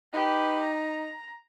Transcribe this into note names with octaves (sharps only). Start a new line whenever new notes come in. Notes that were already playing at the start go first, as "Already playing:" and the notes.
D#4 G4 B4
A#5